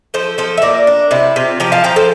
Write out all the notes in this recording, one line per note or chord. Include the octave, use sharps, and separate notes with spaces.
F3 A4 C5
F3 A4 C5
E5
A#2 A#4 D5
D4
C3 E4
C3 F4
F3 G4 A#4
F5 A5
F3 G5 A#5
A4 C5